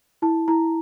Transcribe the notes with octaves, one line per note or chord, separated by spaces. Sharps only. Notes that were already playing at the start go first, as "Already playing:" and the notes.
E4 A5
E4 A#5